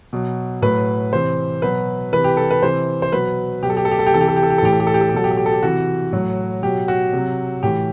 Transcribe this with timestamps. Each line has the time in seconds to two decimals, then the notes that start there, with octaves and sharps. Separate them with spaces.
0.13 B2 F#3
0.62 A2 F#3 B4
1.12 C3 E3 C5
1.62 B2 F#3 B4
2.13 C3 E3 B4
2.24 G4
2.37 A4
2.50 B4
2.63 C3 E3 C5
3.02 C5
3.12 B2 F#3 B4
3.63 B2 G4
3.67 F#3 A4
3.77 G4
3.85 A4
3.91 G4
3.99 A4
4.06 G4
4.13 C3 E3 A4
4.21 G4
4.28 A4
4.36 G4
4.43 A4
4.50 G4
4.58 A4
4.62 A2 E3 G4
4.72 A4
4.80 G4
4.87 A4
4.94 G4
5.01 A4
5.09 G4
5.13 B2 F#3 A4
5.24 G4
5.31 A4
5.37 G4
5.46 A4
5.52 G4
5.63 C3 E3 F#4
6.13 A2 F#3
6.63 B2 F#3 G4
6.88 F#4
7.13 C3 F#3
7.63 A2 E3 G4